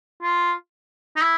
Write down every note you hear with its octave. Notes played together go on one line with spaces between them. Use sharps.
F4
D#4
E4